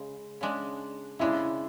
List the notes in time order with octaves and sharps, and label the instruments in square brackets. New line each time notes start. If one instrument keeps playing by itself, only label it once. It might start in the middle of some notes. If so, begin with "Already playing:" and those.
Already playing: [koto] C#3 G#3
C#3 G#3 D4
[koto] C#3 G#3 D4 [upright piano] E4